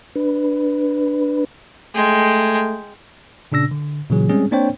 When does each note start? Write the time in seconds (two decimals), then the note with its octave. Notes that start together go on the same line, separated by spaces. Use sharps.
0.16 D4 B4
1.95 G#3 A3 G5
3.52 A#2 C#3 D4 E6 A#6
3.71 D3
4.10 A#2 C#3 E3 F#3 G#4
4.29 G3 G#3 C4 C#4 G#4
4.51 A#3 C4 D4 C5 C#5 G5